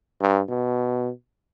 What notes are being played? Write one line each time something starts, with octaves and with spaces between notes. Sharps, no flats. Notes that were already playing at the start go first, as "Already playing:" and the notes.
G2
B2